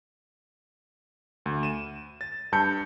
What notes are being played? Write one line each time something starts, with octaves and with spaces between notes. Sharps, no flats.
D2
D#7 E7
A6
G2 A5 G6 C#7